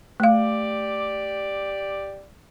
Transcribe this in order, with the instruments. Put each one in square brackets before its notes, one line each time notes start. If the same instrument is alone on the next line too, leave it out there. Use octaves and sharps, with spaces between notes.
[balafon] A3 F5 [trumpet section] G4 D5